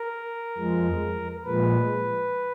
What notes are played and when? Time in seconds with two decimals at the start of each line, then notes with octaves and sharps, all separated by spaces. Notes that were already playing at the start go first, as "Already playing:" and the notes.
Already playing: A#4
0.58 F2 F3 G#3
1.45 A#2 F3 G#3 B4